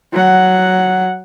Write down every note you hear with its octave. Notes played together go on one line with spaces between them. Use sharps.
F#3 F#5